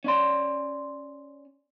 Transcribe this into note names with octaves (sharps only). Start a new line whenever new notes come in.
C#4 D5 C6